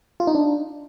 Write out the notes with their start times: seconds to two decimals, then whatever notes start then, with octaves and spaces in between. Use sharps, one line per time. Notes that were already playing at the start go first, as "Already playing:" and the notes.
0.20 F4
0.27 D#4
0.35 D4